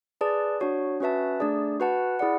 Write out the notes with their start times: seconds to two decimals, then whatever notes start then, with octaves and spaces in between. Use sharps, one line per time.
0.21 G#4 B4 D5 A5
0.60 D4 F#4 C#5
1.00 C#4 F#4 B4 E5 A5
1.40 A3 D4 G#4 D5 A5
1.80 F#4 B4 F#5 A5
2.19 E4 G#4 D5 F#5